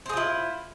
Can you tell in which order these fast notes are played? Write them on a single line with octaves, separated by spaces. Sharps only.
C5 G#4 F4 E4